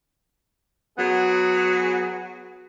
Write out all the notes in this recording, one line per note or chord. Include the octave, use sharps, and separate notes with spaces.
F#3 B3 G#4